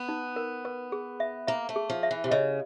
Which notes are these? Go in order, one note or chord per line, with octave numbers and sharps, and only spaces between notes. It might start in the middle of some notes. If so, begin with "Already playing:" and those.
Already playing: B3
D#4
A#4
B4
G#4
E5
A#3 E5
A3
G#4
F3
E5
E3
C3
C#3 D#5